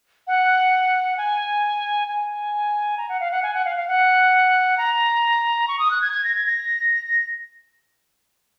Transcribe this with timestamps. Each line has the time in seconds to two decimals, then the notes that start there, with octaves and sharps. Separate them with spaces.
0.27 F#5
1.17 G#5
2.08 G#5
2.98 A#5
3.09 F#5
3.20 F5
3.31 F#5
3.43 G#5
3.54 F#5
3.65 F5
3.76 F5
3.88 F#5
4.78 A#5
5.68 C#6
5.79 D#6
5.91 F#6
6.02 G#6
6.13 G#6
6.24 A#6
6.35 G#6
6.46 A#6